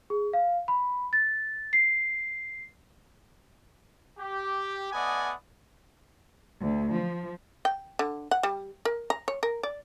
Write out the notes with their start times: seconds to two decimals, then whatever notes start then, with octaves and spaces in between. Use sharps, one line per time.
0.10 G#4
0.33 F5
0.68 B5
1.13 A6
1.73 C7
4.18 G4
4.92 A3 B3 D5 D#5 F#5 G#5
6.60 D2
6.93 F3
7.65 G5
7.99 D3
8.31 F#5
8.43 G3
8.85 A#4
9.10 A#5
9.28 C#5
9.43 A#4
9.63 D5